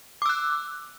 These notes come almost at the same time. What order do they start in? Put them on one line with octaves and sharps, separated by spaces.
D6 E6 F#6